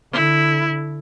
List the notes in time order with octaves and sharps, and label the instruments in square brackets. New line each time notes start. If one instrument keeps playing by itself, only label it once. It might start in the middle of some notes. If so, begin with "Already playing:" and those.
[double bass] D3 [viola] E4